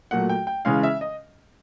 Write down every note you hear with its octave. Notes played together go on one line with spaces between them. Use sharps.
A#2 F#3 A3 F#5
G5
G5
C#3 E3 G#3 C#4 F5
E5
D#5